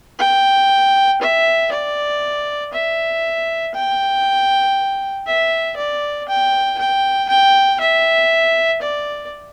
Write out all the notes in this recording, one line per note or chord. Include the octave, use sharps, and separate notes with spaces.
G5
E5
D5
E5
G5
E5
D5
G5
G5
G5
E5
D5